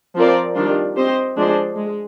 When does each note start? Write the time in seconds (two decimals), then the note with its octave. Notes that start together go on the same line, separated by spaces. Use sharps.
0.15 F3 C4 F4 A#4 D5
0.55 D#3 G3 D4 F4
0.96 C4 G4 C5 D#5
1.36 F3 G#3 D4 G#4 C5
1.77 G#3